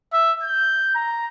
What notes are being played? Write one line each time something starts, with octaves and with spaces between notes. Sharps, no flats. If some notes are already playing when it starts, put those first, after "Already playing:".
E5
G6
A#5